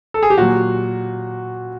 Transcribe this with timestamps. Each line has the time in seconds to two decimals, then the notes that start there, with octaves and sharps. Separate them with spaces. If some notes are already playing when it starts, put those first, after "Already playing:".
0.14 A4
0.23 G#4
0.30 G4
0.38 A#2 F#3 F#4